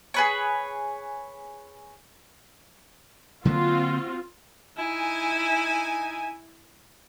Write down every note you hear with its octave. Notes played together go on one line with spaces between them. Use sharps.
G#4 B4 C#5
D3 F#3 A#3 C4 F4 F#4
D#4 E4 G#5